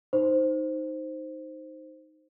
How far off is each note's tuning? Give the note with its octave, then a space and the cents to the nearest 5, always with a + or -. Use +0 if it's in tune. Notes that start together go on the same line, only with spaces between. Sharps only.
D#4 +0 C5 +0